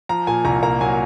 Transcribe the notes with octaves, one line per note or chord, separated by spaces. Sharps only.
F3 A#5
A#2 G#5
C2 A#5
A#3 A#5
F#3 G#5